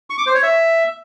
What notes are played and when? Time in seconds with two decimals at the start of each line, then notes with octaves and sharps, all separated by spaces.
0.10 C#6
0.18 D6
0.26 C5
0.35 C#5
0.43 E5